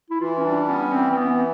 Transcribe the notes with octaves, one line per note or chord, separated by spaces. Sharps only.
E4
E3 F4
C#4
G3 D4
B3 C#4
E3 C4
C4
E3 B3